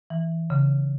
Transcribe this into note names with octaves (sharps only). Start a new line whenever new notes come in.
E3
C#3